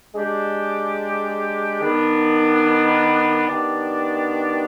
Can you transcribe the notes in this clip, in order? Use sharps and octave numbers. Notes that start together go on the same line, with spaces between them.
G#3 D4 G4
D#3 B3 D4
D#3 B3 D4 G4 D5